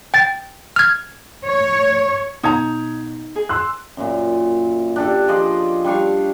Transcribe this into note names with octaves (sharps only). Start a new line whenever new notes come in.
G5 A6
F6 G#6
C#5
B2 D#4 A#5 G#6
G#4
C6 E6 F#6
F#2 A#2
D4 G4 A4
F3 G#4 D5 D#5
G3 D4 F5 C#6